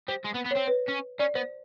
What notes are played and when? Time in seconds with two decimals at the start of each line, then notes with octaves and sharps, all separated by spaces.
0.08 G3 C5
0.25 G#3
0.35 B3
0.46 B3
0.51 C#5
0.56 C4 C5
0.68 B4
0.89 C#4
1.19 C#4 D5
1.35 B3 C5